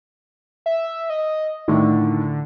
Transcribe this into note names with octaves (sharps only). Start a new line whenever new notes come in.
E5
D#5
A2 D3 D#3